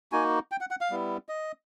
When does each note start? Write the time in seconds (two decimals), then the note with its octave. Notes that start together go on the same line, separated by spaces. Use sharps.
0.12 A#3 D#4 F#4 G#5
0.51 G5
0.61 F#5
0.71 F#5
0.81 F5
0.90 G3 B3 E4
1.29 D#5